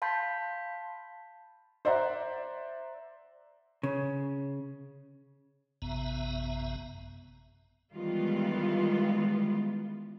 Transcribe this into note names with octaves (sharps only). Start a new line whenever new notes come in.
F5 A5 B5 C6 G6 B6
C5 D5 E5 F#5 A#5
C#3
A1 F#2 C3 B3 E5 A#5
D#3 E3 G3 G#3 B3 F4